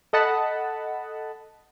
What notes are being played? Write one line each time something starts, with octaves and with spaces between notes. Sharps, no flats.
A4 D#5 F#5 A5 B5